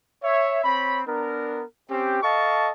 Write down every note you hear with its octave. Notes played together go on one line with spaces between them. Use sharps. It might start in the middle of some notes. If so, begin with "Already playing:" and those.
C#5 E5
C4 C#5 B5
B3 D4 A#4
C4 C#4 G4
A4 D#5 F5 A5 C#6